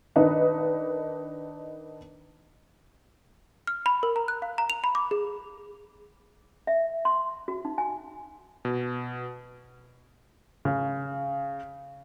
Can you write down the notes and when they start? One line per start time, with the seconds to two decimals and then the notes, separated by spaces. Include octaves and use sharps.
0.16 D#3 D4 D#4 B4
3.67 F6
3.86 B5
4.03 A#4
4.16 A#5
4.28 F#6
4.42 F5
4.58 A#5
4.70 F7
4.84 B5
4.95 D6
5.11 G#4
6.67 E5
7.05 C6
7.48 F#4
7.65 D#4
7.78 G#5
8.65 B2
10.65 C#3